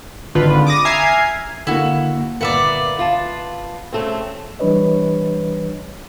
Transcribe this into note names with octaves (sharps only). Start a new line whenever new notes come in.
G#1 D3 F4 B4
D6 D#6 A#6
E5 G#5 A#5 F6 G#6 C7
D3 A#3 E4 F#4
G1 A#2 A#3 B3 D5 E5 F#5
B3 F4 A5
C#3 A3 C4
E3 G3 D4 B4 C#5 D#5